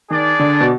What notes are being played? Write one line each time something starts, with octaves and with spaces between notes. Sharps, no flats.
D#3 D4 G#4 D5
D3
B2